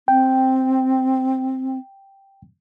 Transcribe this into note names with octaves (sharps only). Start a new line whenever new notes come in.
C4 G5